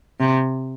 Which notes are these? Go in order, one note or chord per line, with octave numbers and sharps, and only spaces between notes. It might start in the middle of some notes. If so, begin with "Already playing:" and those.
C3